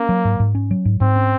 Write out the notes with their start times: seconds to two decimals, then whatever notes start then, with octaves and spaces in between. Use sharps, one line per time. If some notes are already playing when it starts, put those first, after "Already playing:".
Already playing: A#3 C#4
0.09 F#3
0.25 G#2
0.40 G#2
0.55 C#4
0.71 F#3
0.85 G#2
1.01 G#2 C4
1.16 C#4